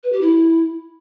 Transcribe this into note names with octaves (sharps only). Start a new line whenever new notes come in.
B4
G4
E4